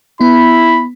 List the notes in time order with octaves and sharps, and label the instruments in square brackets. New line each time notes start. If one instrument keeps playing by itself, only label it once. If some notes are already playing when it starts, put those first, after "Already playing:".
[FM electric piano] B3 [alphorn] E4 [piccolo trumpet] B5